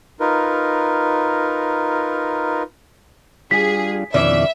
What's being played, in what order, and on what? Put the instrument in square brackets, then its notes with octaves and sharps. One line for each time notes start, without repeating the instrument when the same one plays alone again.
[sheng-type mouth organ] D#4 F4 A#4 B4
[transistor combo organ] G3 D4 F4 [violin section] G#4 [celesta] B6
[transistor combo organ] F2 B2 D#3 [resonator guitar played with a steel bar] E3 C#4 D5 [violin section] E5